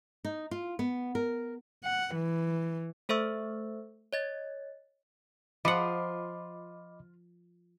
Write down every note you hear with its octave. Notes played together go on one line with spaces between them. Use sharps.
D#4
F4
B3
A#4
F#5
E3
A3 A4 C5 E5 C#6 E6
C#5 D#5 A6
F3 F4 C5 D#5 F#5 B5 D6